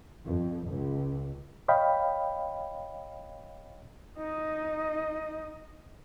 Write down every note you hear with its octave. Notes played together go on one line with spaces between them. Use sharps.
F2
C#2
C#5 D#5 F5 G5 B5
D#4 D#5